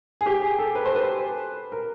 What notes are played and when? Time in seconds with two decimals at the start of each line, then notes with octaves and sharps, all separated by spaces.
0.21 G#4
0.26 G4
0.42 G#4
0.59 A4
0.75 B4
0.85 C5
0.95 B4
1.72 A#4